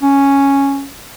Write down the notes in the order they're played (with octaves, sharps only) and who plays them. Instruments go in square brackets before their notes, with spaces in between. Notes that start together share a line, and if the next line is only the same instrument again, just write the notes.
[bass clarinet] C#4